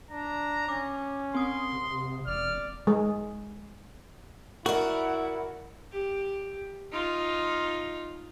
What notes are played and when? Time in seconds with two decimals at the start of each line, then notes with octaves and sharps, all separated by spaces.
0.11 D4 A#5
0.68 C#4 D6
1.35 C4 C6 D#6
1.72 C3
2.27 E1 D5 F6
2.87 G#3
4.66 E4 F#4 A#4 D5 F#5
5.92 G4
6.92 D#4 F4